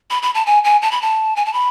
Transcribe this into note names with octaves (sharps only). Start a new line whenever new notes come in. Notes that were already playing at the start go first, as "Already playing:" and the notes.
B5
B5
A5
G#5
G#5
A5
B5
A5
G#5
A5
B5